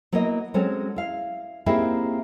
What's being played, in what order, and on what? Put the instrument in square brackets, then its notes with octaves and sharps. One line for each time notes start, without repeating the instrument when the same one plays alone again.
[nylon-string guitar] F#3 A#3 B3 E4 D#5
F#3 G#3 C4 C#4 A4
E4 F5
A#3 C4 D#4 E4 G4 G#4